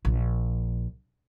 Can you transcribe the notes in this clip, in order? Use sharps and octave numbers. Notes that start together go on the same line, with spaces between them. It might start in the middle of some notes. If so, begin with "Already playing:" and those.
A#1